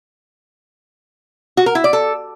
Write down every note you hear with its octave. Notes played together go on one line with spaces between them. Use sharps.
F#4
A#4
E4
D5
A4